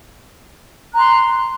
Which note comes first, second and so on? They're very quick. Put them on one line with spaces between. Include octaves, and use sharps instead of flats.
F#6 A#5 C6